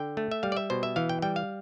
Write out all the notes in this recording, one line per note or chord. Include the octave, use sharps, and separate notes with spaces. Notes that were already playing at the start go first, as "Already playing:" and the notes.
Already playing: D3 G5
A3
E5
G3 F5
D5
E5
B2 C5
E5
E3 F5
G5
G3 G5
F5